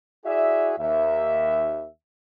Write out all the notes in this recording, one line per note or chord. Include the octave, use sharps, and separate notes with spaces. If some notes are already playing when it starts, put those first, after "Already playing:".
E4 F#4 G#4 D5 E5
D#2 E5